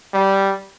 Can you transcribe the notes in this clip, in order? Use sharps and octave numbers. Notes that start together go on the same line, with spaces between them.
G3